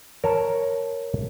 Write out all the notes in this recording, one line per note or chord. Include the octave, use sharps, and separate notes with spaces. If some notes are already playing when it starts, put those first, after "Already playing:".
A#4 C#5 A5